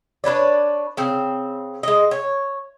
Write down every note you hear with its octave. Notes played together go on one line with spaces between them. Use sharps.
D4 B4 C#5 D5
C#3 C4
G#3 D#5
C#5